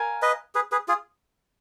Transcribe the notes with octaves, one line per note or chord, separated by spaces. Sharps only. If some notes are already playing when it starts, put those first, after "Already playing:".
Already playing: A#4 F5 G#5
B4 D#5
G#4 B4
G#4 B4
F4 G#4